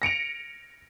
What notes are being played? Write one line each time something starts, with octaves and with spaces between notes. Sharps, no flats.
A#6 C#7 D7 F7